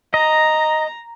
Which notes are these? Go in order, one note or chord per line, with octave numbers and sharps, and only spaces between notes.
D#5 A#5